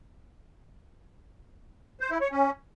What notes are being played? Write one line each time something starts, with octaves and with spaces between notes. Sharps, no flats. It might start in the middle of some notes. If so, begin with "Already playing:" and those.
C5
E4
C#5
C#4